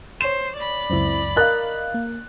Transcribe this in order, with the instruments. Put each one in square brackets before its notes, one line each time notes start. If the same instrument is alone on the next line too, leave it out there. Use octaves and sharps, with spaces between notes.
[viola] C5 [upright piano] C#5 E7
[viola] D5 B5
[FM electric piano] C#2 F#2 [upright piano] C4 E4
[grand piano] A#4 F#6 [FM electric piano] D#5 [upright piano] F5 A6
[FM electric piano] A#3